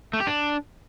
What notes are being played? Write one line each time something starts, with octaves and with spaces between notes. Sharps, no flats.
A3
G4
D4